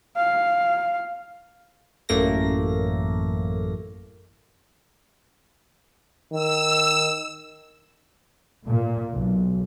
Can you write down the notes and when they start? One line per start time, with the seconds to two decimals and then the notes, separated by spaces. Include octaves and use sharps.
0.17 F5
2.09 A1 F#2 A3 A#3 A#6
6.32 D#3 E6
8.65 A#2
9.12 B1